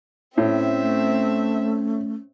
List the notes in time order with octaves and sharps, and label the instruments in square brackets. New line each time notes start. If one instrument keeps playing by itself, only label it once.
[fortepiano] A2 [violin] C4 E5 [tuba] C#4
[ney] A3